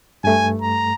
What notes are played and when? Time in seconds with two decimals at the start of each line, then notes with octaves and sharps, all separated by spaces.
0.24 G2 A3 G#5
0.62 A#5